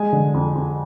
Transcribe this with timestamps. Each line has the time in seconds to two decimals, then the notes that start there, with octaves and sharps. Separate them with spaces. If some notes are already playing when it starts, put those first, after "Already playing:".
Already playing: G#3 G#5
0.13 D3
0.34 F2
0.55 F2